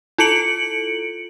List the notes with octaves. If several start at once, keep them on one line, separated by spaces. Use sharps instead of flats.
E4 F4 A4 C#7 D7 F#7